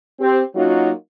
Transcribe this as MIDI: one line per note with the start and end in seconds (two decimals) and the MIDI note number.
0.20 0.41 60
0.20 0.41 67
0.55 0.90 54
0.55 0.90 58
0.55 0.90 61
0.55 0.90 63
0.55 0.90 65
0.55 0.90 66